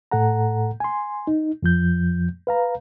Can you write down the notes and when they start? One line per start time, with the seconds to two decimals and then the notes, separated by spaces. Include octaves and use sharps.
0.11 A2 A4 F#5 A#5
0.80 G#5 C6
1.27 D#4
1.63 F2 F3 G6
2.47 B4 F5 A#5